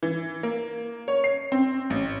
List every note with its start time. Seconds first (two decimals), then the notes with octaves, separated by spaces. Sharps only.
0.03 E3
0.43 A#3
1.08 C#5
1.24 C7
1.52 C4
1.90 A1